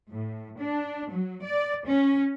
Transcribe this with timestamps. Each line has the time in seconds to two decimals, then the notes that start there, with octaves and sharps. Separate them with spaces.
0.12 A2
0.59 D4
1.10 F#3
1.42 D5
1.86 C#4